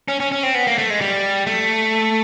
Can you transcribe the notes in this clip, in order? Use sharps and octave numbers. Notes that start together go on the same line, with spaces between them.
C#4
C#4
C#4
C4
B3
A#3
A3
G#3
G3
A3